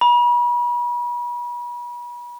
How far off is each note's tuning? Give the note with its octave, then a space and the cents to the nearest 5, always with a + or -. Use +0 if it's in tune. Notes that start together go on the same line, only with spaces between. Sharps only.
B5 -40